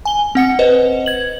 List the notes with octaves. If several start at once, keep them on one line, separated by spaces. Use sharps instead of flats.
G#5 G7
C4 F#5 C#7
B4 C5 D#5
G#6 F#7